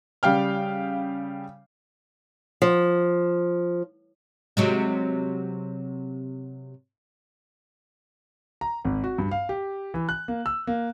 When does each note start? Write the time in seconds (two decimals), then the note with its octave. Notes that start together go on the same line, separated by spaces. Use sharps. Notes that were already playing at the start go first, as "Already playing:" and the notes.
0.23 C#3 G3 F5 G5 F6
2.62 F3
4.57 C3 F#3 G#3
8.61 A#5
8.85 G#1
9.04 F#4
9.18 G2
9.31 F5
9.49 G4
9.94 E3
10.09 F#6
10.28 A#3
10.46 E6
10.67 A#3